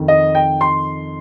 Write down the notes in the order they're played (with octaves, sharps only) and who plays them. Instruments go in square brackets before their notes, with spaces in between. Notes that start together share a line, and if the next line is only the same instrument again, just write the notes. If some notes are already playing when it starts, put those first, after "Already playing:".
Already playing: [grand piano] F2 D#3
D#5
G5
C6